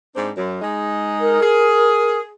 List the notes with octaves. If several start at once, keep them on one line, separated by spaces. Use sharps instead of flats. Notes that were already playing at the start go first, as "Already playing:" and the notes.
G#2 C4 D4
F#2
G#3 D#4
A#4
G#4